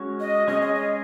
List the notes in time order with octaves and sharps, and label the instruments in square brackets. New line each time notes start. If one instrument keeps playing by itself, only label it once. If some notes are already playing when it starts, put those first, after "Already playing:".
Already playing: [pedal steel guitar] G#3 C#4 F#4 C#5
[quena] D#5
[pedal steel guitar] G#3 C#4 G#4 C#5 [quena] D#5
[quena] D#5
D#5